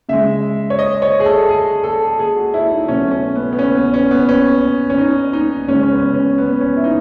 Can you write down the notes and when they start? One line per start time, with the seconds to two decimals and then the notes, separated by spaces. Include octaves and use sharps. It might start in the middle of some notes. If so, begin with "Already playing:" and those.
0.09 C#3 G#3 E5
0.70 C#5
0.79 D#5
1.02 C#5
1.20 G#4
1.25 A4
1.49 G#4
1.84 A4
2.19 G#4
2.36 F#4
2.54 E4
2.71 D#4
2.88 B2 F#3 A3 C#4
3.11 C#4
3.36 B3
3.53 B3
3.59 C#4
3.75 B3
3.94 C#4
4.11 B3
4.29 C#4
4.90 C#4
4.98 D#4
5.33 D#4
5.68 C#3 G#3 C#4
5.83 C#4
5.91 B3
6.14 C#4
6.38 B3
6.61 C#4
6.77 E4
6.84 D#4